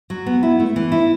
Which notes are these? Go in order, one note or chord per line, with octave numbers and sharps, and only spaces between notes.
F#3
B3
E4
A3
E3
E4